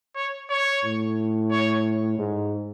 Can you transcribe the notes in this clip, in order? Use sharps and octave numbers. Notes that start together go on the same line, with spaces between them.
C#5
C#5
A2
C#5
G#2